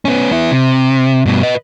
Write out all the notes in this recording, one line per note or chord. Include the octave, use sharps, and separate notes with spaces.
B3 C#4
B3 E4
C3
G2 B2
B4 D#5